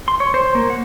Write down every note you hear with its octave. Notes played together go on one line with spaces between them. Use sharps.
C6
C#5
C5
A#3
F#5